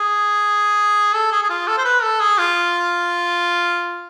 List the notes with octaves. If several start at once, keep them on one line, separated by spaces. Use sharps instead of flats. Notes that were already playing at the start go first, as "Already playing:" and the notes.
Already playing: G#4
A4
G#4
G#4
F4
A4
C5
B4
A4
G#4
F4